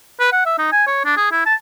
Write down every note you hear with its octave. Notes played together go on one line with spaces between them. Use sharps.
B4
F#5
E5
D#4
G#5
C#5
D4
G#4
E4
A5